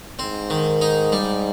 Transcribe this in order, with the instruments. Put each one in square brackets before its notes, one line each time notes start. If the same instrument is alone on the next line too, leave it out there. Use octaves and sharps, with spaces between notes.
[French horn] G#2 [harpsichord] C4
[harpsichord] D#3
D#4
G3